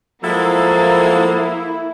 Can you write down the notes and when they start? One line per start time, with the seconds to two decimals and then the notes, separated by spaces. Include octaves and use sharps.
0.24 F3 F#3 G#3 A#3 E4 A4